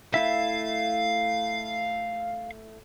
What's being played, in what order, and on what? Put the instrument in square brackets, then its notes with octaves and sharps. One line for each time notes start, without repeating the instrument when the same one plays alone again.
[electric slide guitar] A3 E4 E5 [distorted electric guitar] F5